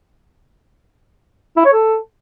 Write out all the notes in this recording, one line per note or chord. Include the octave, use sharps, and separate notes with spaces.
E4
C#5
A4